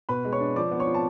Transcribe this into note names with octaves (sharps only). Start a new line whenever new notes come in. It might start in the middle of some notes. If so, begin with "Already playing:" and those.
B2 B4 B5
G#3
C#5 C#6
D4
F3 D5 D6
B3
C#5 C#6
F4
A5